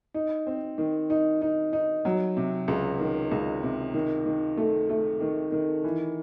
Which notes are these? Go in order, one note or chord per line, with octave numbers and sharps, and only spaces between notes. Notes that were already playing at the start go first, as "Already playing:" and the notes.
D#4
C4
D#3
D#4
D#4
D#4
F#3
C3
C#2
D#3
C#2
C3
D#3
D#3
A3
A3
D#3
D#3
E3